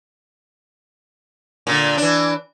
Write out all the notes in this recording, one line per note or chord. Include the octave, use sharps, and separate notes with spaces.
A#2 D3
E3 D4